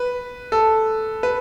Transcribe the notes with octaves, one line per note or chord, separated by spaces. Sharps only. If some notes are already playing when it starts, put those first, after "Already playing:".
Already playing: B4
A4
B4